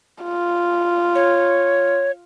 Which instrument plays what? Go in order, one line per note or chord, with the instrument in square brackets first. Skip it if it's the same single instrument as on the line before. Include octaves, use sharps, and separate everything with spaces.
[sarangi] F4
[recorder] C#5